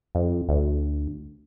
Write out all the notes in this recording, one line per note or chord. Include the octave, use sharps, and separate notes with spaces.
F2
D2